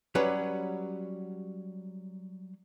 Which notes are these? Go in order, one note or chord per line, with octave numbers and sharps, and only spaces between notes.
F#3 G3 C#4 B4